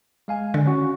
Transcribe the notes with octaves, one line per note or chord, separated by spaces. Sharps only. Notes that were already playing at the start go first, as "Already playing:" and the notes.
G#3 F5 G#5
D3
C#4 F#4